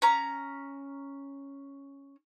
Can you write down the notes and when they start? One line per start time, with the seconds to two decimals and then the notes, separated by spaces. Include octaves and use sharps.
0.02 C#4 A#5